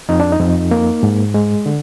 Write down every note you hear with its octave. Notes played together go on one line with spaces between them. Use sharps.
F2 D#4
D4
D#4
F2
A#3
G#2
G#3
D3